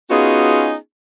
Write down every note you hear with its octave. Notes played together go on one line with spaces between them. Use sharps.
B3 C#4 D#4 F4 F#4 G#4